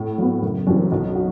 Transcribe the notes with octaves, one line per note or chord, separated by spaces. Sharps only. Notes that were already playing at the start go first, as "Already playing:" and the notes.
Already playing: A2
F#3 B3
F#1
F#2 E3 G3 C4
B1
F#4